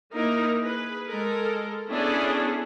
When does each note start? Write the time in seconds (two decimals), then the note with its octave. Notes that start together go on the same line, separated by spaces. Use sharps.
0.12 A#3 D#4 E4 A#4
0.61 G#4 B4
1.07 G#3 A4 A#4
1.88 B3 C#4 D4 E4 G#4 A4